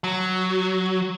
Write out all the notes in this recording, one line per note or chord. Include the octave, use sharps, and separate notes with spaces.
F#3